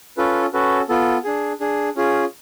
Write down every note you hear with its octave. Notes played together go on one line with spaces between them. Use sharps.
C#4 F4 A4 B4
C#4 F#4 A4 B4
B3 F4 A4
D4 G#4
D4 G#4
C#4 F4 G#4